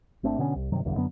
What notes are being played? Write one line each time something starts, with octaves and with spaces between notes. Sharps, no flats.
G#1 A3 C4 D4
B2 D3 B3 C#4
C2
G2 C3 D#3 F#3
B1 E2 G2 D3
F#2 D3 F#3 B3